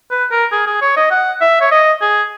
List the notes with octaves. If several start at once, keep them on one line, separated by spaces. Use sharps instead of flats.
B4
A#4
G#4
G#4
C#5
D#5
F#5
E5
C#5
D#5
G#4